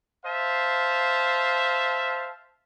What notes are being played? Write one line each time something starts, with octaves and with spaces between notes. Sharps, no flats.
C5 E5 F5 A5